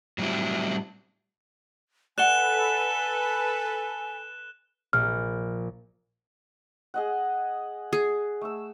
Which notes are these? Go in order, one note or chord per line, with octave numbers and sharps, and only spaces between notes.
A2 F#3 G3 C4 E4
A4 B4 D5 F#5 G#5 F#6 E7 G7
A#1 F6
G#4 D#5 F#5
G#4
A3 E6